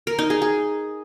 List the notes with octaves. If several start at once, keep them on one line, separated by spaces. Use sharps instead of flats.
A#4
D#4
G#4
G#4